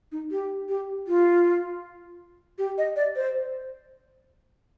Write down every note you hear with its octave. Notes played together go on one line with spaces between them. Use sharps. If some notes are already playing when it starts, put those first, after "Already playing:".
D#4
G4
G4
F4
G4
D#5
D5
C5